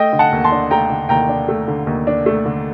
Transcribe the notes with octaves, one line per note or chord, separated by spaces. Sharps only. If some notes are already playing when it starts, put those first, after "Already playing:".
Already playing: A3 D#5 G5
D3
F#5 A5
D#2
A5 C6
D4
A3 G5 A#5
D3
D#2 G5 A#5
D4
A3
D3
D#2
D4
A3
D3